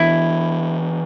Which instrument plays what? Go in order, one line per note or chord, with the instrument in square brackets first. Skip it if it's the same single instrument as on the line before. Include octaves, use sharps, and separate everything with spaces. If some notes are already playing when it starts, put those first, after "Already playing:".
Already playing: [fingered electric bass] E3 B3 D4 [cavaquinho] E4